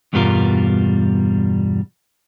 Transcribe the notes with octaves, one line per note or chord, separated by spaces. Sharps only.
E2 G2 B2 G3 F4 A#4